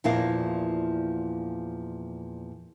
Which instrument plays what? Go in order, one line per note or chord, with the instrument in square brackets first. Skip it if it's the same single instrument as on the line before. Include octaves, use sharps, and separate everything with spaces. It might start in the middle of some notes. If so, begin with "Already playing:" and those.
[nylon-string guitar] E2 A#2 F3 E4 A#4 F5